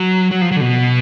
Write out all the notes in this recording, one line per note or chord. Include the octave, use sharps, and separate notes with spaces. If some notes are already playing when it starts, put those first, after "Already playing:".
Already playing: F#3
F#3
F3
F#3
D3
B2